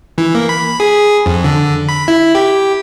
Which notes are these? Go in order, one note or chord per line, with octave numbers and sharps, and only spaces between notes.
E3
A#3
B5
G#4
F2
D3
B5
E4
G4